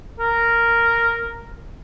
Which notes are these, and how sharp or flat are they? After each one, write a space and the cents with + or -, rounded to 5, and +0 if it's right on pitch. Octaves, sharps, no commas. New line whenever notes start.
A#4 -5